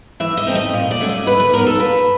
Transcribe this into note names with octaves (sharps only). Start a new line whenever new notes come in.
E3 E5
D#5
A3 C4 D#4
D#5
A#2
D5
F#3 A3 C#4
D#5
D3 B4
B4
F#3 B3 D#4 A#4
A4
A#2 B4